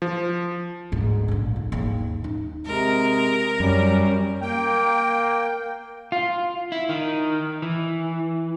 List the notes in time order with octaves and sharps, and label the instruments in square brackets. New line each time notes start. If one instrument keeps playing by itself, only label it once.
[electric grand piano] F3
[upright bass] D2 G#2
A#1 D3
D#4
D#2 G#2
D#4
[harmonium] C3 [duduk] G#3 [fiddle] A#4
[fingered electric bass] F#2 [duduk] G3 [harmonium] C#4
[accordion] A#3 G5
[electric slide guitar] F4
E4
D#3
E3